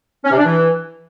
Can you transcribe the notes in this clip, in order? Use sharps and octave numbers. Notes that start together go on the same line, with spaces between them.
C#4
C3
D4
E3